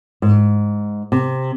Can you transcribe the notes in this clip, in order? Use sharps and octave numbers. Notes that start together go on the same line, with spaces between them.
G#2
C3